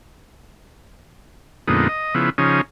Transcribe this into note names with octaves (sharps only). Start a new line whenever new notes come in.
F2 A#2 D3 G#3 B3 D#4
D#5
C#3 F3 B3 E4
C#3 F3 C#4 D#4